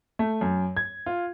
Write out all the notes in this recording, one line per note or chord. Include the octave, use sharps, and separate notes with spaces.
A3
F#2
G#6
F4